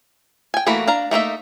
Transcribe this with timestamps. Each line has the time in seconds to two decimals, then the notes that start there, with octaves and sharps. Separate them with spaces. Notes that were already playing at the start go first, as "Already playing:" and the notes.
0.54 G5 G#5
0.66 E3 A3 A#3 F#4 B5
0.87 D4 F5 A#5
1.11 A3 A#3 D#4 E5